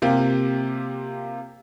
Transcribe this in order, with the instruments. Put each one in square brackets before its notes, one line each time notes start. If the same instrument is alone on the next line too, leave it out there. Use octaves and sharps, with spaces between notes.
[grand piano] C3 A#3 F4 G4